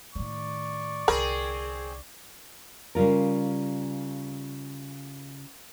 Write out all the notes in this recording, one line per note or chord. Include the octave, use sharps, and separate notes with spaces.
A2 D#3 D5 C#6
C2 D3 C4 G#4 A#4 B5
C#3 G3 F4 A#4